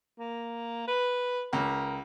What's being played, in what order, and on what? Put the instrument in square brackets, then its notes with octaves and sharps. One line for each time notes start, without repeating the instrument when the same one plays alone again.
[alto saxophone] A#3
B4
[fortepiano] C#2 [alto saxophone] A#4